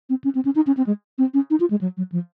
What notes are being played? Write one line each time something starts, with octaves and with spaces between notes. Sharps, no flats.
C4
C#4
C4
C#4
D#4
C#4
C4
G#3
C4
C#4
D#4
F4
G#3
F#3
F#3
F3